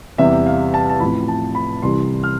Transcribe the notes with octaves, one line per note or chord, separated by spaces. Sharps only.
E2 C3 G3 E5
F5
A5
A5
A1 A2 F3 C4 B5
A5
B5
C2 C3 E3 G3 C6
F6